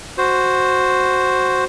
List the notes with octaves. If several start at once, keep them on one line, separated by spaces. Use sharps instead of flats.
F#4 C5